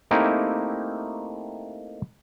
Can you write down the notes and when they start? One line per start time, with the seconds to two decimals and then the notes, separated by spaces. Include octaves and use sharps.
0.11 A3 A#3 C4 D#4 E4 G4